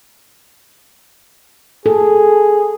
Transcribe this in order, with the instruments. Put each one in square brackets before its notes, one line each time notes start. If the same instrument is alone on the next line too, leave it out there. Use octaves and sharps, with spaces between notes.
[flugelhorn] G#4 [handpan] A4